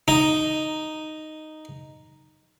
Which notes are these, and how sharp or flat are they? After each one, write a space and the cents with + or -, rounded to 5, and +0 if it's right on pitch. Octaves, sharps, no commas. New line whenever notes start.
D#4 -5